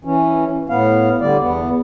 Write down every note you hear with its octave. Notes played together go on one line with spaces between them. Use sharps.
E3 C#4
A2 B3 F5
D3 G3 D5
E2 B3